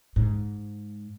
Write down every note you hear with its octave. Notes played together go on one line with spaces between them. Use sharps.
G#2